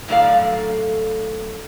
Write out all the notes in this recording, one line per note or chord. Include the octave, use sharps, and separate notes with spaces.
A2 D3 F#3 A4 D5 F5